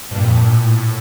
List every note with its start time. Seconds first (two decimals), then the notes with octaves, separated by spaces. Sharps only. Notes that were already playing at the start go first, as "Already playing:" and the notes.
0.11 G2 A#2
0.24 F2
0.38 G2
0.50 A2